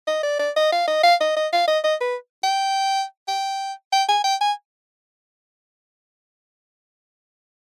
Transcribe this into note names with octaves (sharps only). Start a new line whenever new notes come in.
D#5
D5
D5
D#5
F5
D#5
F5
D#5
D#5
F5
D#5
D#5
B4
G5
G5
G5
G#5
G5
G#5